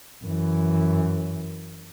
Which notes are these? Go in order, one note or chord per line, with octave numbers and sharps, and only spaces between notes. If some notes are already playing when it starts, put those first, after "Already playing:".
F#2 E3